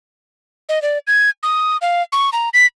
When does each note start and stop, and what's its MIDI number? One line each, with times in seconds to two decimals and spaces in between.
0.69 0.82 75
0.82 0.98 74
1.07 1.30 92
1.43 1.77 87
1.81 2.02 77
2.12 2.30 85
2.33 2.49 82
2.54 2.66 95